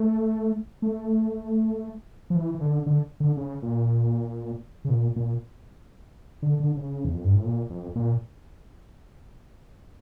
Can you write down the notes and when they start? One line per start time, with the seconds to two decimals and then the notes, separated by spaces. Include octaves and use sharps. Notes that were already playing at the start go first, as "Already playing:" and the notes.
Already playing: A3
0.82 A3
2.30 F3
2.36 E3
2.55 E3
2.61 D3
2.86 D3
3.20 D3
3.37 C#3
3.62 A#2
4.85 C#3
4.90 A#2
5.16 A#2
6.42 D3
6.60 D3
6.77 C#3
7.05 E2
7.14 F2
7.24 G2
7.34 A2
7.45 A#2
7.70 F2
7.96 A#2